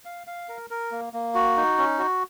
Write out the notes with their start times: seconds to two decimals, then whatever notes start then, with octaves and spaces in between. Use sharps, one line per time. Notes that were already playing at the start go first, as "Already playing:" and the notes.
0.05 F5
0.27 F5
0.49 A#4
0.70 A#4
0.92 A#3
1.13 A#3
1.35 F#4
1.57 D#4
1.78 C#4
1.99 F#4